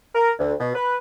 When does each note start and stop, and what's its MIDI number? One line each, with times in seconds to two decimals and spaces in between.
0.15 0.32 70
0.39 0.54 38
0.60 0.71 47
0.75 0.97 71